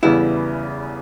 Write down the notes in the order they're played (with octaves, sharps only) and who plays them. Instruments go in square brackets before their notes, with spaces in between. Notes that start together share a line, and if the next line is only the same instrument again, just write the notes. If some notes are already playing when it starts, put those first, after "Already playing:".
[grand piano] E2 C#3 G3 B3 [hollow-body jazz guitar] E4